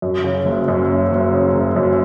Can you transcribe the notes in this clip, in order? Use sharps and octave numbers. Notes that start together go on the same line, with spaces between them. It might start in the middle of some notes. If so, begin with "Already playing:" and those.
F#2
C#3
F#1
F#2
F#1
F#1
C#3
F#1
F#2